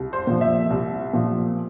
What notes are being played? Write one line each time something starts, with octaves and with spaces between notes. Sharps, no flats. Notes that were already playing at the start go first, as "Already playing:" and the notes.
Already playing: C2
C5
A#2 F3
E5
C2
A#2 F3